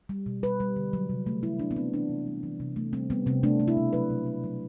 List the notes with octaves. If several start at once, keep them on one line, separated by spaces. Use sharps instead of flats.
G3
B2
G3 B4
G3
D3
F#3
C3
A3
E3 E4
C3 D4
B3
G3 C4
E3 D4
C3
G3
E3
C3
A3
G3 C4
G3 B3
C3 C4
A3 D4
A3
E4
B2
F#3 B4
B2
A3
F#3